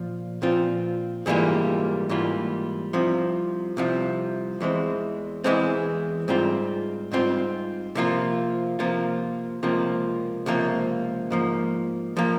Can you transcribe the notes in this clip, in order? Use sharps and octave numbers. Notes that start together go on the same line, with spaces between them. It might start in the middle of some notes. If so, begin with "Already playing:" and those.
Already playing: A#2 F3 F4
A#2 F3 C4 F4
G#2 E3 G3 A#3 F4
G#2 E3 G3 A#3 F4
C2 C3 F3
C2 C3 F3
E2 E3 G#3 C4
E2 E3 G#3 C4
G#2 G3 C4 F4
G#2 G3 C4 F4
C3 F3 A#3 F4
C3 F3 A#3 F4
C#2 C3 F3 A#3
C#2 C3 F3 A#3
G#2 F3 A#3
F3 A#3